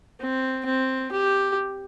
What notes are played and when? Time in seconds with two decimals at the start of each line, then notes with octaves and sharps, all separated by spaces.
0.20 C4
0.66 C4
1.12 G4